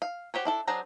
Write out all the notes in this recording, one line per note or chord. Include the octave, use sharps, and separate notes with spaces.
F5
F#4 G4 C5 C#5
D4 E4 A4
F#3 D4 G#4 C5 A#5